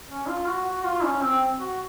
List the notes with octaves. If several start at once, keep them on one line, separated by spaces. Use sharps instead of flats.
C#4
F4
F#4
F#4
F4
C#4
C4
F#4